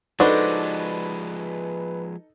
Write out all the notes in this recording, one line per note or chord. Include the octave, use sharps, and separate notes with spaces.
F3 G#3 D4 D#4 F#4 A4 B4 C5